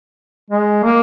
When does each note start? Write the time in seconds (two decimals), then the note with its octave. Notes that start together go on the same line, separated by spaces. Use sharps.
0.51 G#3
0.84 A#3